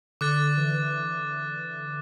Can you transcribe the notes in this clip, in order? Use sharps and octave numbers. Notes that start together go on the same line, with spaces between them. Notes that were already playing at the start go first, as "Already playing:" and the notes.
D3 D6 F#6 A6
E3